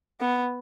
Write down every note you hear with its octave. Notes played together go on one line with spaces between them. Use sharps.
B3